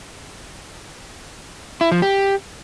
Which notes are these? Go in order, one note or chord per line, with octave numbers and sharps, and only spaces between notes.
E4
F3
G4